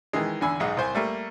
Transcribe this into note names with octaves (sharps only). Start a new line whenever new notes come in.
D#3 E3 G#3
E2 D3 G#5 B5 E6
B1 G#2 D#4 G#4 F#5
C2 C5 G#5
G3 A3 A#3